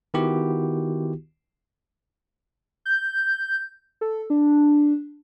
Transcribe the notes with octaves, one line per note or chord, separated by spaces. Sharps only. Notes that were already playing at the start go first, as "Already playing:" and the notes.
D#3 B3 E4 F#4 G4
G6
A4
D4